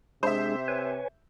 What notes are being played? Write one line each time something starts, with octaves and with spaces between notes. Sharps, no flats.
C3 G#3 D4 G#4 C5 E5
B4 C#5 G#5